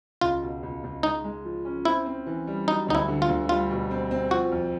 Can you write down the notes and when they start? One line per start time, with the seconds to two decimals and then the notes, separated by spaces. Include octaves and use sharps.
0.21 C#2 F4
0.42 B2
0.63 C#2
0.84 C#2
1.03 G#3 D#4
1.24 G#3
1.45 F3
1.65 C#4
1.85 C4 E4
2.06 C4
2.26 E3
2.47 G3
2.68 F#3 D#4
2.88 D2 D#4
2.95 E4
3.08 D3
3.22 F4
3.29 D2
3.49 G3 F4
3.71 B2
3.91 C4
4.11 C4
4.31 F3 F#4
4.52 F2